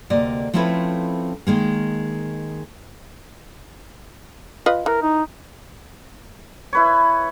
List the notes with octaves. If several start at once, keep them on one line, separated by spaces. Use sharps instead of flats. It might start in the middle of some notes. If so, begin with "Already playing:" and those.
D2 C3 A#3 D5 D#5
F3 A3 C4 C#4 E4 B4
D#3 G#3 A#3
F4 B4 D#5
E3 A#4
D#4
E4 B4 C#5